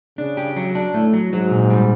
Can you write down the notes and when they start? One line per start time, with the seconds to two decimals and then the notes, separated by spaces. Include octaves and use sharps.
0.18 C#3 D4
0.37 G4
0.56 F#3
0.75 D4
0.94 A2 A3
1.13 F#3
1.32 G#2 F#3
1.51 A#2
1.70 G3